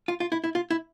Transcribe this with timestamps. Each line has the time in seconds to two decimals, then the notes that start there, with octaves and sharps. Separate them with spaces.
0.08 F4
0.20 F4
0.32 E4
0.44 E4
0.55 F4
0.71 E4